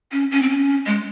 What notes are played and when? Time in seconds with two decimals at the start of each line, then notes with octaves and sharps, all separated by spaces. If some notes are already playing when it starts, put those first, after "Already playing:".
0.12 C#4
0.31 C#4
0.42 C4
0.49 C#4
0.87 G#3